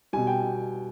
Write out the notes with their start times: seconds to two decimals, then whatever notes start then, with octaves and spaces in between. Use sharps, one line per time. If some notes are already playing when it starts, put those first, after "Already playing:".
0.13 B2 G3 G#5
0.27 G5